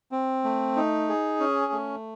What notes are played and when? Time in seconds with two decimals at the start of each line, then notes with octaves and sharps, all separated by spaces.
0.12 C4
0.44 A3
0.76 D#4
1.09 G#4
1.40 C#4
1.72 A3